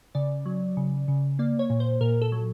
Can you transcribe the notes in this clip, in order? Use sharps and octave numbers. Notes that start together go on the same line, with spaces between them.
C#3 D5
F#3
C#3
C#3
A#3 D5
C#5
A#2
C5
A#2 A#4
A4
F#3